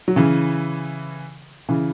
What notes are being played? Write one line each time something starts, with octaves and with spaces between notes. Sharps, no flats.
F#3
C#3 E3
C#3 E3